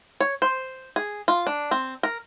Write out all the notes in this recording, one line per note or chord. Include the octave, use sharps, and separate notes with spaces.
C#5
C5
G#4
F4
D4
C4
A#4